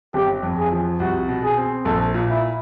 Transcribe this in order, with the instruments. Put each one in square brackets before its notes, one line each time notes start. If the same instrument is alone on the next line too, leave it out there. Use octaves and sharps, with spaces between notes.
[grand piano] G1 [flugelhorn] G4
[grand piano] F2
[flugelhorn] G#4
[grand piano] F3
[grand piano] C2 [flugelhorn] F#4
[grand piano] B2
[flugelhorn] G#4
[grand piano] C4
[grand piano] A#1 [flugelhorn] A4
[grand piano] A#2
[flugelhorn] E4